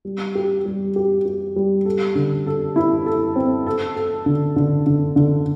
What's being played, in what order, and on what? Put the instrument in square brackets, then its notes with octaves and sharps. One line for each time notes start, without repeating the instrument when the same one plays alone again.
[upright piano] G3
G4
G3
G4
G4
G3
A4
D3
A4
E4
A4
C4
A4
A4
D3
D3
D3
D3